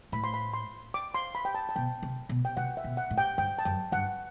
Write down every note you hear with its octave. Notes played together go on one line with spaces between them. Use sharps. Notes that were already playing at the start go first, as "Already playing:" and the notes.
A2 B5
C6
B5
C6
D6
C6
B5
G5
A5
A5
B2 G5
C3
B2
G5
C3 F#5
E5
B2
F#5
A2
G5
G2 G5
A5
F#2 G5
G2 F#5